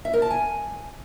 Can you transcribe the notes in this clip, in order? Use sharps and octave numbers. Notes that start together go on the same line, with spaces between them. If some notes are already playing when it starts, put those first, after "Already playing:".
E5
A#4
A5
G#5